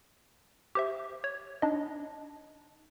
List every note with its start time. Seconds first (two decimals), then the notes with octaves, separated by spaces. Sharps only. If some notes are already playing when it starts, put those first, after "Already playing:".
0.75 G4 C5 E5
1.24 C#5
1.62 D4 D#4 D#5